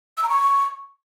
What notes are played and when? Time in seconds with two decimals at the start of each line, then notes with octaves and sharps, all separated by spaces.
0.17 E6
0.23 A#5
0.29 C#6